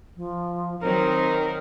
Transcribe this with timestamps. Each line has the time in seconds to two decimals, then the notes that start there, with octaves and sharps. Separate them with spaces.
0.17 F3
0.83 D#3 F#3 C4 D#4 A#4